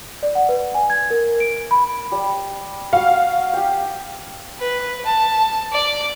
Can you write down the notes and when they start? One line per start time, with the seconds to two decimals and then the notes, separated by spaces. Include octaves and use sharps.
0.23 D5
0.35 F#5
0.49 B4
0.74 G#5
0.90 G#6
1.10 A#4
1.40 D7
1.71 B5
2.12 G3
2.93 F#4 F5 F#5
3.53 G4 G5
4.59 B4
5.05 A5
5.72 D5 D6